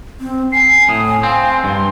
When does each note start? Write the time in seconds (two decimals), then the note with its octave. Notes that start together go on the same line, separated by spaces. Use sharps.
0.21 C4
0.52 G#5 C7
0.89 A2 D#6
1.23 C4 F5
1.64 G2 C6